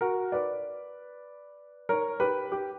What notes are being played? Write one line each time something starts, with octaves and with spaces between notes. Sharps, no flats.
F#4 A#4
B4 D5
A#4 C#5
G4 B4
G4